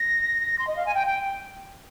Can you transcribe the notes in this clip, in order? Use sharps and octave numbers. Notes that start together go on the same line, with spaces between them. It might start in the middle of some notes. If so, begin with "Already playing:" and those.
Already playing: A#6
C6
D#5
F5
G#5
G5
G5